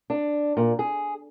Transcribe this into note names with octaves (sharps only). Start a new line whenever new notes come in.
D4
A#2
G#4